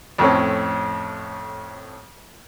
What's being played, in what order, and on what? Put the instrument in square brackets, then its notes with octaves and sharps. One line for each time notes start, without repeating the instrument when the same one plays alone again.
[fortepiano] F2 A2 C4 C#4